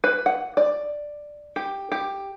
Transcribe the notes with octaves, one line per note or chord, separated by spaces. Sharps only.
B4
F#5
D5
G4
G4